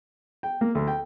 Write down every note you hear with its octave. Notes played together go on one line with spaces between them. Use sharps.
G5
A#3
D2
G5